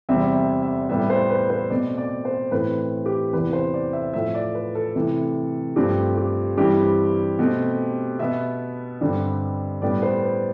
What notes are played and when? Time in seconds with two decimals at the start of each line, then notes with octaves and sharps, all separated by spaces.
0.09 E2 C3 G3 C4 E5
0.35 E5
0.62 E5
0.89 A2 G3 B3 E5
1.10 C5
1.30 B4
1.50 C5
1.70 B2 A3 C4 D5
1.98 D5
2.25 C5
2.51 A2 E3 A3 C4 B4
3.06 G4
3.33 E2 C3 E3 B4
3.53 C5
3.74 D5
3.93 E5
4.13 A2 F3 A3 E5
4.34 D5
4.54 B4
4.75 A4
4.96 C3 E3 A3
5.76 G2 F3 A3 C4 G4
6.17 G4
6.57 G2 E3 G3 C4 G4
7.39 B2 A3 C4
8.19 B2 B3 E5
9.01 G2 D3 G3 C4
9.82 A2 G3 B3 D5
10.02 C5
10.23 B4